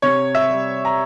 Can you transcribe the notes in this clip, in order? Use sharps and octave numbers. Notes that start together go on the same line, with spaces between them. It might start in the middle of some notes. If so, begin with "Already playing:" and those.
C3 C#5
E5
G3
A#5